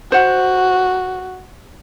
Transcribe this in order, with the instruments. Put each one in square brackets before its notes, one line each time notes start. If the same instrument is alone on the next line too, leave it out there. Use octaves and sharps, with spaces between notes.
[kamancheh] F#4 [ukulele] C5 F#5